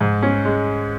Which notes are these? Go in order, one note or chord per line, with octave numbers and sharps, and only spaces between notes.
G#2
C#4
G#3